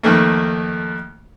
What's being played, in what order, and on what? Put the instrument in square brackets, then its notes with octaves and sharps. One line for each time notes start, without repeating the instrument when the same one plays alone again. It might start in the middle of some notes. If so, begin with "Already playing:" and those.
[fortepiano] F2 D#3 A3 A#3